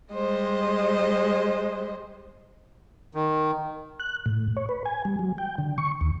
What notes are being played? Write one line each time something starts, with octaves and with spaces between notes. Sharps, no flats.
G3 G#3 C5 D#5
D#3
F#6
A2
C#5
B4
G#5
G3
F#3
G5
D3
C#6
D#2